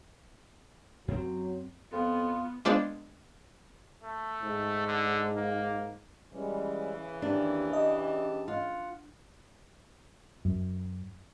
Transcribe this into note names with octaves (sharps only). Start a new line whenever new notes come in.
F#2 F#3 C4
F2 B3 F4
G#3 B3 D4 F4 C5 D5
A3
G#2
D3
A#3
C#3 E3 G3 G#3 C#4
D#2 D4 G4 A#4
G4 D#5 A5
F4 F#5
F#2